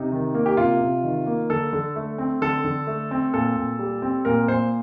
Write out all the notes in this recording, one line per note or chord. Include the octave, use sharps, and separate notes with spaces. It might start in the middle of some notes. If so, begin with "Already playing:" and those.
Already playing: C3 D#4
D#3
A#3
G4
C3 F4
C3
D#3
A#3
D3 A4
D3
A3
C4
D3 A4
D3
A3
C4
A#2 A4
A#2
G3
C4
A#2 A#4
A#2 C5